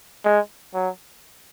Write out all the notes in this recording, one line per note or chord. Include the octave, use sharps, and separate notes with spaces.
G#3
F#3